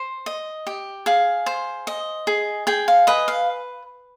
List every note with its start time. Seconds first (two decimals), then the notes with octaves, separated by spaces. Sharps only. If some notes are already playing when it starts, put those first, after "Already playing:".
Already playing: C5
0.26 D#5
0.67 G4
1.06 G#4 F5
1.46 C5
1.87 D#5
2.27 G#4
2.67 G#4 G5
2.88 F5
3.07 B4 D#5
3.28 F5